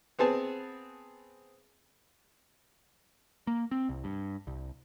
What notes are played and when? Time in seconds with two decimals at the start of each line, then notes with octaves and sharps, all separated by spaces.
0.19 B3 C4 G#4 A5
3.47 A#3
3.71 C4
3.89 C2
4.04 G2
4.47 C2